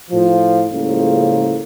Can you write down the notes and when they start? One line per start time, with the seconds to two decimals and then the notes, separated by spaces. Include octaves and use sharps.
0.11 A2 F3
0.70 C#2 A2 C#3 F3 G3 A#3